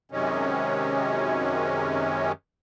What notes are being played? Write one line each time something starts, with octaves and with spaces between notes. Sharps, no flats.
F#2 C3 D#3 G#3 C#4